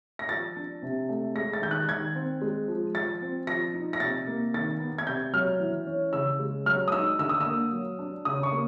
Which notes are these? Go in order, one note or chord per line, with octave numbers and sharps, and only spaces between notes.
A#6
F3 A6
D4
C3
A3
G#3 A#6
A6
D#3 G6
F#6
D#3 G#6
C4
G#3
F3
F3 A6
C4
F3 A#6
D#4
A#6
C3 A6
A#3
D#3 A6
B3
G#6
C3 G6
F#3 F6
E3
C#4
C#3 E6
G#3
F#3 F6
D#6
D#4 E6
D3 E6
D#6
A#3 E6
F#3
D4
C#3 D#6
C#6
A#3